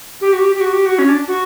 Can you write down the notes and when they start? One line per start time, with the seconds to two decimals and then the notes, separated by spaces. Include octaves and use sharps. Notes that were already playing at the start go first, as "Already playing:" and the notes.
0.21 G4
0.33 F#4
0.41 G4
0.55 G4
0.61 F#4
0.72 G4
0.86 F#4
0.99 C#4
1.09 D4
1.28 F#4